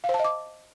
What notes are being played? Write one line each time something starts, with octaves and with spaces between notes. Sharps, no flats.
F5
C5
A5
D#5
D6